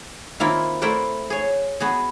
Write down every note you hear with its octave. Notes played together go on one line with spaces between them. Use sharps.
D#3 A#3 C4 E4 F4
A3 E4 A#4 C5 D5 F#5
G#4 C#5
B3 F#4 G#4